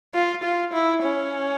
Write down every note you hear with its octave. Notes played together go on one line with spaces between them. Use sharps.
F4
F4
E4
C#4